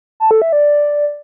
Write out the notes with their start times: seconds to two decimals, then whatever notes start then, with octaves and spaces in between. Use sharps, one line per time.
0.20 A5
0.31 A4
0.42 E5
0.53 D5